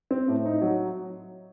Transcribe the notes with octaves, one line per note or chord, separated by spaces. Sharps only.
C4
A2
D#4
F#3